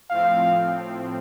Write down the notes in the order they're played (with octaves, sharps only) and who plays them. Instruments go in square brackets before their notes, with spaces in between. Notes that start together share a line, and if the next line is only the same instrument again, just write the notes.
[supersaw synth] A2 F3 C4 [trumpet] F5